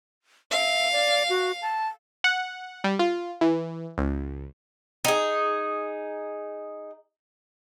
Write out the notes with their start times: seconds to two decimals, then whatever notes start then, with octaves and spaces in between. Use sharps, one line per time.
0.51 E5 F5
0.92 D5
1.29 F#4
1.62 A5
2.24 F#5
2.84 G3
2.99 F4
3.41 E3
3.98 C#2
5.05 D#4 G#4